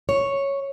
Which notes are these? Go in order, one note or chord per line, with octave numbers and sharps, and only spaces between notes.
C#5